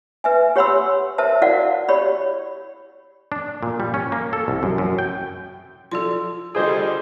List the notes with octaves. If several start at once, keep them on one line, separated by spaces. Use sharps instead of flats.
B4 E5 G#5
G4 C#5 F#5 B5 C6 E6
A#4 C5 E5 A5
E4 F#4 A#4 D5 F5 F#5
G4 C#5 D5 B5
D4
A#2
G3
C#4
A#3
A4
C2
F#2
F#2
G5
F3 A4 D5 C6
D3 G3 F4 G#4 C5 D#5